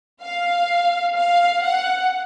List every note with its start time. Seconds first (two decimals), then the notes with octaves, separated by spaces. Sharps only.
0.22 F5
1.16 F5
1.62 F#5